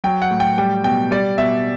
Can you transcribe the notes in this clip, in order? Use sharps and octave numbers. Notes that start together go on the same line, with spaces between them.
F#3 G5
F#5
A2
G5
G3 G5
B2 G5
G3 D5
B2 E5